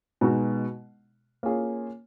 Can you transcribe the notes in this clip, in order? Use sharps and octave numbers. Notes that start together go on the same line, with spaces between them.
B2 G#3 D#4 F#4
A#3 C#4 F4 G#4